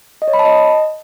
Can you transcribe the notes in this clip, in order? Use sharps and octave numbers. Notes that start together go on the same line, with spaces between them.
D#5
C#5
B5
A5
D#5